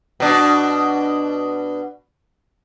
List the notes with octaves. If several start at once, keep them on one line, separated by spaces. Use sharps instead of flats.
B2 D4